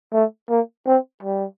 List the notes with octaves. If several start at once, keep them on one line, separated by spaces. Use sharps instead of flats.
A3
A#3
C4
G3